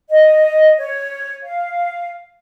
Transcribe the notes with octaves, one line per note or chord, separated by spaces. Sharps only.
D#5
C#5
F5